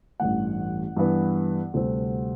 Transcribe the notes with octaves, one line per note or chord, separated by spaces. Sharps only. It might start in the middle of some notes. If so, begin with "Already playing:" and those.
A1 G2 E3 A3 F#5
G2 E3 B3
D2 C3 G3 C4